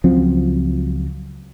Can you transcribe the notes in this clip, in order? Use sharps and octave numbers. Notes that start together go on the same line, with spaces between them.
C#2 F3 F#3 C4